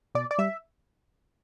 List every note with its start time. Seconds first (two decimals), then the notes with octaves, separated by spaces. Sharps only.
0.15 B2 D5
0.31 D5
0.38 G3 E5